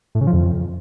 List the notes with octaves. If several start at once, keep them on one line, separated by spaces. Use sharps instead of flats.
A2
C#3
F3
F2